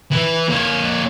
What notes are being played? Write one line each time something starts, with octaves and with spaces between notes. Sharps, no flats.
E3
A#3 C#5